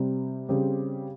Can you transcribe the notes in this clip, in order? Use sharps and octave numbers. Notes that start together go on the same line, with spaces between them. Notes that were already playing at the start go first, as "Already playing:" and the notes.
Already playing: C3 G3 C4
C#3 G3 C4 G4